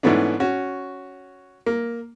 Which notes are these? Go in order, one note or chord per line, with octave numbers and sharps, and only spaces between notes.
G#2 E3 A3 B3 C#4 D4
C#4 F#4
A#3